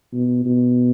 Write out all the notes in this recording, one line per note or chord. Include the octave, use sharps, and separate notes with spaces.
B2
B2